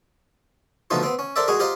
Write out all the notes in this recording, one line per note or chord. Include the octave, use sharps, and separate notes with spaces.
B2 D3 F3 A3 D#4 F4
B3 C4
C#4
A4 A#4 C5 D5 E5
G#3 F#4 G#4 D#5
F4 G4 C5 D#5 F5 A#5